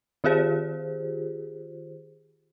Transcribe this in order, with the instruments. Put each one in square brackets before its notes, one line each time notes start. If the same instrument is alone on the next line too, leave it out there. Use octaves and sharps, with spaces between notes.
[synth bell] D#3 F4 G4 G#4 C5